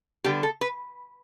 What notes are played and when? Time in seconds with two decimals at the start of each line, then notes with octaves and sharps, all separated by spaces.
0.24 D3 G3 B3 D4 G4
0.43 A4
0.61 B4